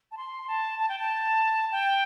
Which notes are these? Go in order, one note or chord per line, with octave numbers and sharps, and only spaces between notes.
A5
C6
A5
A5
G5
A5
G5